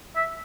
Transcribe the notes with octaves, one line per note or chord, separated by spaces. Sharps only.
E5